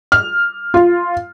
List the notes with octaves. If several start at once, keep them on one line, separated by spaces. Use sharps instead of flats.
F6
F4